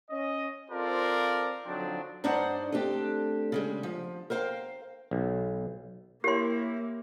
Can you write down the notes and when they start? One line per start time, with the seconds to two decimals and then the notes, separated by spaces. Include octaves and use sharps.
0.10 C#4 D#5
0.69 C4 F4 A4 A#4 C5 D5
1.66 D3 F3 F#3 C4 D4 D#4
2.24 G2 D4 D#4 C5 D5 F#5
2.72 A3 C4 D4 G4
3.52 C#3 G3 G#3
3.83 F3
4.30 A#4 C5 F5 G5
5.11 B1
6.24 A#3 E4 G4 A#4 C#5 C6